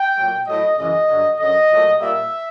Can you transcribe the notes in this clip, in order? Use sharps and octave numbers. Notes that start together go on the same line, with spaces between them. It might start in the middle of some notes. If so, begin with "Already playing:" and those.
Already playing: G5
A#2 F#3 A3
A2 F#3 A3 D#5
F#2 C#3 E3 G#3 D#5
G2 D3 F#3
F#2 D3 F#3 D#5
A#2 F#3 A3
A#2 G3 A#3 E5